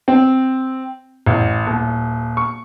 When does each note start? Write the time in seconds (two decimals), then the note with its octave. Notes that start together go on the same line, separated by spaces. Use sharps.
0.08 C4
1.26 A1
1.67 D#1
2.37 C#6